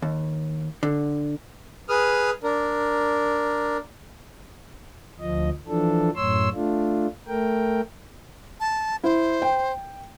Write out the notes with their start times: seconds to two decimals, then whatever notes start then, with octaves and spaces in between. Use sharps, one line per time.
0.02 D#2
0.83 D3
1.88 G#4 B4 D#6 F6
2.43 D4 A#4
5.20 D2 F3 D#5
5.68 E3 F3 D4 A4
6.16 F#2 A2 C#5 C6 E6
6.54 A3 D4 F4
7.27 A3 A#4 G5
8.60 A5
9.04 E4 C5
9.42 G5